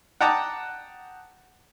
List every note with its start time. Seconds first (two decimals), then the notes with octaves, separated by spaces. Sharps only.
0.21 F#5 G5 A5 A#5 D6 D#6